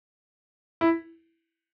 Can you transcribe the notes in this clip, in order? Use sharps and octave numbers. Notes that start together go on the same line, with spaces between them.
E4